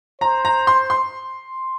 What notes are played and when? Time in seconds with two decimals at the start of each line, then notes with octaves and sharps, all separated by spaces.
0.21 C5 A#5
0.45 A#5
0.67 C6
0.90 C6